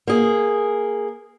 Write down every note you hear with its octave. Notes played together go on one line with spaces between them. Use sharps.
A#3 G#4